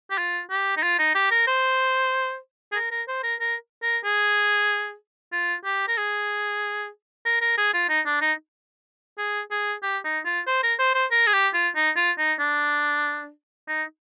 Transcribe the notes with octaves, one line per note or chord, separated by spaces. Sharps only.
G4
F4
G4
D#4
F4
D#4
G4
A#4
C5
G#4
A#4
A#4
C5
A#4
A#4
A#4
G#4
F4
G4
A#4
G#4
A#4
A#4
G#4
F4
D#4
D4
D#4
G#4
G#4
G4
D#4
F4
C5
A#4
C5
C5
A#4
G#4
G4
F4
D#4
F4
D#4
D4
D#4